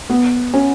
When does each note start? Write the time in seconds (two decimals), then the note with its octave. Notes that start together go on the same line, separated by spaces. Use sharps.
0.10 B3
0.54 C#4